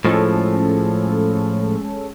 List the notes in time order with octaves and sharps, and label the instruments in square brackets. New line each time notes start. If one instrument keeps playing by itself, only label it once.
[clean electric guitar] A2 F3 [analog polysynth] G#3 C#4 A4